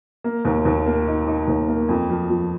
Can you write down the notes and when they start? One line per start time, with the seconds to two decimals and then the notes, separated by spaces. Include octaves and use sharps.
0.24 A#3
0.45 D#2
0.65 D#2
0.86 A#3
1.07 D#4
1.28 D#4
1.48 D#2
1.68 A#3
1.89 F2
2.10 F3
2.30 F3